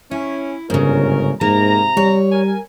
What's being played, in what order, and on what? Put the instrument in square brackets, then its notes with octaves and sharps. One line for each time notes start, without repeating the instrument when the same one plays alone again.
[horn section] C#4 [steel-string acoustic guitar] E4
[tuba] G1 [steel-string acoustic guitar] G#2 C#3 [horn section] C#4 A#4
[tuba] G#2 [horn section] C3 A#5 [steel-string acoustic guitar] A#3
[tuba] G3 [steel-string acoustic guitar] C#5
[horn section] A#4 G#5